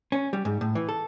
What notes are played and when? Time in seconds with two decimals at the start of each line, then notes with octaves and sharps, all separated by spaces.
0.12 C#4
0.33 G3
0.45 G#2
0.61 A2
0.75 E3
0.89 A4